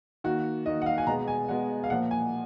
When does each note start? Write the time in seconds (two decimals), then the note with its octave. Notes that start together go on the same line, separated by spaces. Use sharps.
0.24 D#3 A#3 F#4
0.66 D#3 A#3 D#5
0.82 F#5
0.86 F5
0.98 G#5
1.07 B2 G#3 B3 A#5
1.28 G#5
1.49 B2 G#3 B3 F#5
1.84 F5
1.90 A#2 F3 A#3 F#5
2.11 G#5